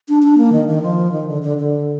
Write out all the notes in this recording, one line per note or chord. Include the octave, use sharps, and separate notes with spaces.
D4
D4
A#3
D#3
D#3
F3
D#3
D3
D3
D3